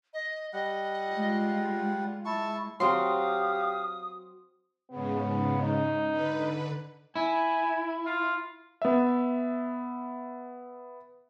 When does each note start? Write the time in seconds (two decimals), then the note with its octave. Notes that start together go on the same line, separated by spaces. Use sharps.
0.13 D#5
0.53 G3 D#5 F#5
1.07 G#3 F4
2.25 G#3 E4 A5 C#6
2.80 F#3 C4 F#4 G4 F5 C6 D#6
4.90 G#2 C#3 B3
5.62 D#4
6.10 D3 B4
7.16 E4 G#5
8.06 F4
8.82 B3 E5